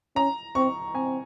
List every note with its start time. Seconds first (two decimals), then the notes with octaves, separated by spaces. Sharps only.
0.16 C#4 A#5
0.55 C4 C#6
0.95 C4 G#5